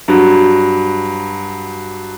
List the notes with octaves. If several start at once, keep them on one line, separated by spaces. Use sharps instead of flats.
G2 F#3